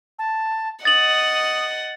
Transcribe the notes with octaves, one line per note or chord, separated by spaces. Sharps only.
A5
D#5 F#5 D#6 A6 F#7